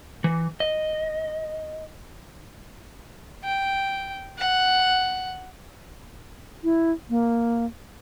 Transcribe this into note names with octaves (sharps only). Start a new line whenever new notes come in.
E3
D#5
G5
F#5
E4
A#3